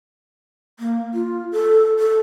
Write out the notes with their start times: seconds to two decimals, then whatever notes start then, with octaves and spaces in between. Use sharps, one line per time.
0.79 A#3
1.14 F4
1.52 A4
1.99 A4